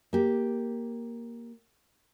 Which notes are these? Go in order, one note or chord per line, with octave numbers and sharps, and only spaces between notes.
A#3 G4